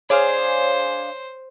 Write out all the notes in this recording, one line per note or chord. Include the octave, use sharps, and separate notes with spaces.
D4 G#4 C5 C#5 F5